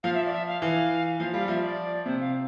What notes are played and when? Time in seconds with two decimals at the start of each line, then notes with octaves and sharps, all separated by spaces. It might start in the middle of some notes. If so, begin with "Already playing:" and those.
0.04 F3 F5
0.14 E5
0.27 D5
0.32 E5
0.48 F5
0.62 E3 F5
1.19 F3 F5
1.34 G3 F5
1.48 F3 E5
1.62 D5
2.06 C3 C5
2.21 F5